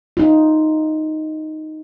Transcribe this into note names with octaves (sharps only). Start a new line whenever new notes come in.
D#4 F4